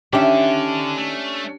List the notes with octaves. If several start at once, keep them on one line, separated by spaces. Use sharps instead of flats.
D3 D#3 C#4 D4 G4 A4 E5
A3